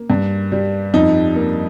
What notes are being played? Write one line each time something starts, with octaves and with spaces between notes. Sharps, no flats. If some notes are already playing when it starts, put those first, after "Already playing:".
Already playing: A#3
G2
G3
F2 D#4
A#3